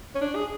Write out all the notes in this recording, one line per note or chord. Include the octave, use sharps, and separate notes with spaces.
C#4
D4
G#4